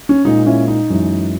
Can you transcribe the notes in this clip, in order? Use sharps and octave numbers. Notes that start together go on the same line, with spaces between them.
C#4
A#2 G#3 D#4
C#4 E4
D#4
F#2 E3 G#3